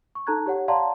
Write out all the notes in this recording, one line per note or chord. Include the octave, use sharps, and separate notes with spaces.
C#6
D#4 A4 A5 A#5 F#6 G#6
G4 C#5 F#5
D5 F5 F#5 A5 A#5 C6